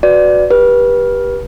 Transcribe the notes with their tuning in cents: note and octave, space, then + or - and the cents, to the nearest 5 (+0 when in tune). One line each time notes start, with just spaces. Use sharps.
F#4 -5 B4 +10 D5 +0
G4 +0 B4 -30